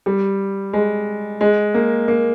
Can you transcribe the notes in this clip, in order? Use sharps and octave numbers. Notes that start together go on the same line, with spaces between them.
G3
G#3
G#3
A#3
A#3